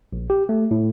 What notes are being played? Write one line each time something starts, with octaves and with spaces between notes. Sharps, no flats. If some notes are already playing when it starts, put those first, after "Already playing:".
A#1
G4
A3
A2